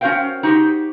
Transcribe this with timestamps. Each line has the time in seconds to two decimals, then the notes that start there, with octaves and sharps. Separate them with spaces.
0.01 C#4 F#4 A#4 C5 F5 G5
0.43 D#4 F#4 G4 C5